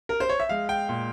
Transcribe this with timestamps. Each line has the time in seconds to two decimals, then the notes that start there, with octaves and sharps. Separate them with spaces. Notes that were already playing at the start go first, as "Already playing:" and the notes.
0.09 A#4
0.20 C5
0.29 C#5
0.40 E5
0.49 G#3 F5
0.69 G5
0.89 A#2